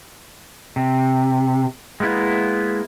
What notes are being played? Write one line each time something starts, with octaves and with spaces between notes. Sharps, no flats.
C3
G#3 A#3 B3 E4